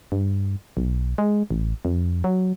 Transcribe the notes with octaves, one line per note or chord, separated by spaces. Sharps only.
G2
B1
G#3
A1
F2
F#3